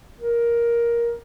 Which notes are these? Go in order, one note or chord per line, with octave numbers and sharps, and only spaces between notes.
A#4